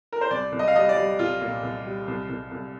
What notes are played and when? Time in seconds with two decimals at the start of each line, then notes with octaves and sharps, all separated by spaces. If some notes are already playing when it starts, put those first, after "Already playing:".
0.12 A#4
0.21 C5
0.31 C2 D5
0.52 C2
0.59 D#5
0.68 F5
0.75 G3 D#5
0.89 D5
0.96 G3
1.19 C2 F4
1.41 A#2
1.63 C2
1.85 G3
2.07 C2
2.29 C2
2.51 C2